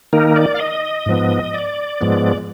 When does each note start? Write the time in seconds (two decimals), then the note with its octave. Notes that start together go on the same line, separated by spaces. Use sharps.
0.13 D#3 A#3 D#4 A#4
0.36 D5
0.54 F5
0.59 D#5
1.06 G#2 F3 B3
1.54 D5
2.01 G#2 F3 G#3 B3